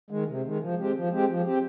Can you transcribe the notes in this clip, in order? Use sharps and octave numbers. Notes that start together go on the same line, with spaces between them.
D#3 G#3
C3
D#3 G#3
F3
G#3 C4 G4
F3
G#3 C4 G4
F3
C4 G4